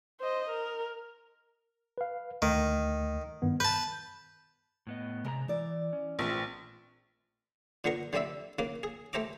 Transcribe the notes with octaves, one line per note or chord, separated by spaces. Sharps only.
C5 D#5
A#4
B4 F5
D2 D#3 A3
G2 D#3 B3
B4 A5 G6
A2 B3 D#5
C3 G#3 A#4 A#5
E3 E4 D5
C#4
A#1 E3 A3 C4
A#2 D3 B3 A#4 C#6
D3 G3 C4 D5 E5 B5
C#3 A#3 D6
G#4
A3 G4 C5 A#5 D6